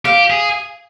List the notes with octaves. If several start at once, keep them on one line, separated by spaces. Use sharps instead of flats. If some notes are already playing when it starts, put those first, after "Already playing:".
G4 F5
G#4